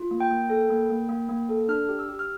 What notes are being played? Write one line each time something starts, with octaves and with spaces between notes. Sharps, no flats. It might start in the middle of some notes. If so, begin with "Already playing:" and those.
Already playing: F4
A#3
G5
A#3
A4
A#3
A#3
A#3
A#3
A4
D4 F6
G4
E6
G4
F6